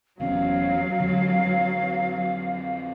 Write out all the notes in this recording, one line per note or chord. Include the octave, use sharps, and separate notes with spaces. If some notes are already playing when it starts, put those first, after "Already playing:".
F1 E2 F#3 C#4 F5
F2 D3